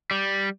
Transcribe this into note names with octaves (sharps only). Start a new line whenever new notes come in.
G3